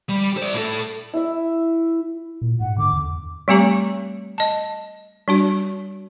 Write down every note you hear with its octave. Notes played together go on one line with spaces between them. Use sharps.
G3
C5 D5
A2 A4
E4 E5
A#2
G#2 F#5
D3 D6
E2
G3 A3 C4 G4 A#5
D#5 A5
G3 D4 F#4